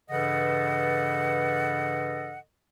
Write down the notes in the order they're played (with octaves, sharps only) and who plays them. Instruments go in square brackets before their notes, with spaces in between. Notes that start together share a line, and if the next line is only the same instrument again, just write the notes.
[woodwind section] G2 C#3 E3 A4 D#5 F#5